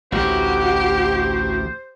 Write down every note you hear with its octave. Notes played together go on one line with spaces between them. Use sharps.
A1 D2 F#4 G4 C5